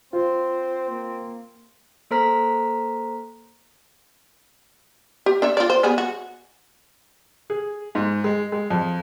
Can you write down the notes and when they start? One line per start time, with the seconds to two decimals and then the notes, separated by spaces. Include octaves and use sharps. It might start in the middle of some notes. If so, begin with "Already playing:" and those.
0.13 C4 F4 C5
0.90 A#3
2.11 A#3 A4 C5 A#5 F6 B6
5.26 G4
5.42 D4 C#5 E5
5.57 F4 D5
5.70 C5
5.83 G3 B3 G#4
5.98 F#4
7.50 G#4
7.95 G#2
8.24 G#3
8.52 G#3
8.70 F2